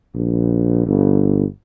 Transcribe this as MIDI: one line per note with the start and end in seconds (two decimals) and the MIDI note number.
0.15 0.84 34
0.87 1.44 31